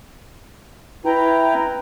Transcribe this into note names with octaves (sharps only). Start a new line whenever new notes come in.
E4 B4 G5 A#5